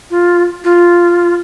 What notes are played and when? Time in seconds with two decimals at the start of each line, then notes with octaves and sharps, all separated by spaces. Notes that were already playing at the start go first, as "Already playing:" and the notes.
0.11 F4
0.64 F4